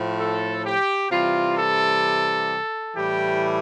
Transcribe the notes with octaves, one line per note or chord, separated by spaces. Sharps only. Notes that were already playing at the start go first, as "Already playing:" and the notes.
Already playing: A2 F3
A4
G4
C3 E3 G3 F4
A4
A2 E3 G3 G4